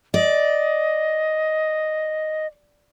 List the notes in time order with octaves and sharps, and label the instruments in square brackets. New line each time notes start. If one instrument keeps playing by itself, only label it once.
[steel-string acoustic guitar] D5 [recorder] D#5